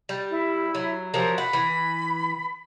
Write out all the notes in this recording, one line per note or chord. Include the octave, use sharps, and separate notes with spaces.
G3
E4
F#3
F3 F#3 G4 A#4
F#5 B5
E3